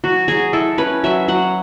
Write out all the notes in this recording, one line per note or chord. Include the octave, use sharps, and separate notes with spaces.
F#3 F#4
F#3 G#4
E4 A4
C#4 B4
F#3 E5
F#3 F#5